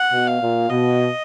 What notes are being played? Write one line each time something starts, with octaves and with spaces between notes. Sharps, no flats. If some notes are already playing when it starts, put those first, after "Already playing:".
Already playing: F#5
B2
F5
A#2
B2 D#5